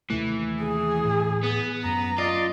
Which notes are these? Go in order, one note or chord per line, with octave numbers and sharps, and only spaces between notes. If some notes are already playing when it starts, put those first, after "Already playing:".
D#2 C3 E3 A3
G#4
A2
B3
F#2 A#5
F4 D5 D#5